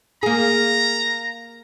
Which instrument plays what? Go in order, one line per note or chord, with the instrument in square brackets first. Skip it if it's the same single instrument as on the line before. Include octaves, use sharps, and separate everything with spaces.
[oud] A#3 G#4 [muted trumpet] A#5